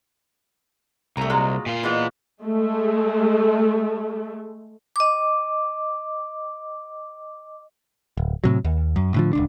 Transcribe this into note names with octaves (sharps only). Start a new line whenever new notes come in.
C2 A3 A#5
A#2 F#3 G#3
A#2 F4
E3 G#3 B3
G#3 A3
D#5 D6
D1
A2 C3 F#3
D#2
F#2
A2 D3 F3
D#1 C#2 D4